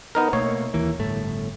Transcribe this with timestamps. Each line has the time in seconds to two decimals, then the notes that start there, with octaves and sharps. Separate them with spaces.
0.15 B3 D#4 A#4
0.33 B2 A3 A#3 C#5
0.74 D#2 E3 A#3
0.99 G1 A2 A3